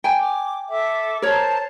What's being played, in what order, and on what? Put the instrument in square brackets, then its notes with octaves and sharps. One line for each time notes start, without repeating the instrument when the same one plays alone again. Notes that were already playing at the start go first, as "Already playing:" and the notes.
[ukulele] G5 G#5
[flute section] D6
A4 E5 D6
[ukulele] A#4 C#5 [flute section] C5 A5 A#5